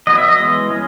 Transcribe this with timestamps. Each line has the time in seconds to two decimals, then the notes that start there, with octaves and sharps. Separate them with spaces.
0.07 F#3 B3 D#5
0.18 E5
0.28 D#5
0.39 E3 G#3 B3
0.70 G#3 C#4